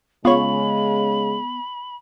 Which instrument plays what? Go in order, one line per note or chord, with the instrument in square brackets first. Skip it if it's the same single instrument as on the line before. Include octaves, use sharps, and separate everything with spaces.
[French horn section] C#3 G#3 [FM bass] B3 [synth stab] F4 C#5 [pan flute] B5